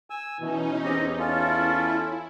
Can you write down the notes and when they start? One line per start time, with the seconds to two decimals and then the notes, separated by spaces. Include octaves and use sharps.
0.10 G#5 E6
0.40 B2 E3 C#4 D#4
0.84 E2 C4 G4 D#5
1.19 C#4 E4 F4 A4